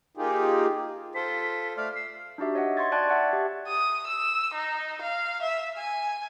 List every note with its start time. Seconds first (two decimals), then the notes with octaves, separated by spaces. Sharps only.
0.17 A#3 D#4 F4 G4 G#4
1.15 F4 A4 C5 B6
1.77 A3 D5 F5 F6
1.95 E6 C7
2.38 D4 D#4 F#4 G4 E5
2.55 C#5 D#5 E5 F#5
2.77 C6 C#6 G#6 A6
2.92 D5 G5 A5 F#6 G#6 A6
3.09 E5 F#5 A5 C#6 F#6 G#6
3.33 G4
3.68 D#6
4.07 E6
4.55 D#4
5.02 F5
5.42 E5
5.77 G#5